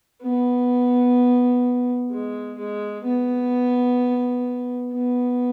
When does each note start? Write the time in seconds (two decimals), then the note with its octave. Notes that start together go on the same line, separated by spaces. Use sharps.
0.22 B3
2.11 G#3
2.58 G#3
3.05 B3
4.93 B3